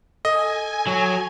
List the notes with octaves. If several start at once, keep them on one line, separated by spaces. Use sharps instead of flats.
A4 D#5 G#5
F#3